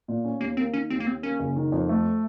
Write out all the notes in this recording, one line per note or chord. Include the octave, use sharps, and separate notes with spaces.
A#2
C#4
D#2 A#3
A#3 C4
D#3 C#4
D#2 C4
A#3
D#2 C4
A#3 C#4
F#1
D#3
F2
A3